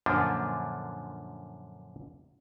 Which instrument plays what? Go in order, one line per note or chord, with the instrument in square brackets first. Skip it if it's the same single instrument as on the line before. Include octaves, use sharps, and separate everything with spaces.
[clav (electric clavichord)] F#2 A#2 D3 F3 A#3 D4